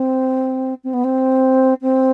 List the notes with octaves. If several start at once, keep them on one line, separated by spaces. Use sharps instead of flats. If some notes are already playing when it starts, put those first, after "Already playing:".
Already playing: C4
C4
B3
C4
C4